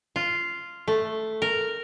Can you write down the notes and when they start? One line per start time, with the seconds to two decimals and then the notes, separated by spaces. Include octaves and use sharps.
0.16 F4
0.88 A3
1.42 A#4